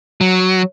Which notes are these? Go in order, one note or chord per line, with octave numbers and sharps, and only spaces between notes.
F#3